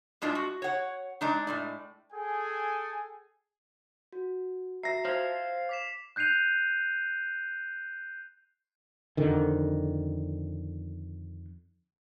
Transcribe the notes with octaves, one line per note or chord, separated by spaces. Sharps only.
A2 G#3 D4 F4
F#4
C#5 F#5
G#3 D4 D#4
A2 G#3 D5
G#4 A4 G5 G#5
F#4
F#4 E5 A#5 A#6 C7
C5 F5 F6 G#6
D6 B6 E7
F#6 G6 C7 D#7 F7
F2 D3 D#3